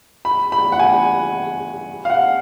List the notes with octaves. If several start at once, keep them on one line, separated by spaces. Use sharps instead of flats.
B5
B5
F#5
G#5
F5
F#5